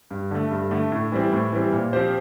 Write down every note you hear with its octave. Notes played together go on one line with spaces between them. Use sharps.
G2
D3 A3
G2
D3 A3
A2
E3 G3 C4
A2
E3 G3 C4
A#2
F3 C4 G4 C5